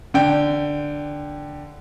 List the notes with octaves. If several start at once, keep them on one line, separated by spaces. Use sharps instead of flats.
D3 G5